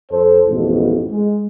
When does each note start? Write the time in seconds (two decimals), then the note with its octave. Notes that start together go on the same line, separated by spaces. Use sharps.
0.11 F2 A4 C5
0.47 A1 F2 G#2 B2
1.10 G#3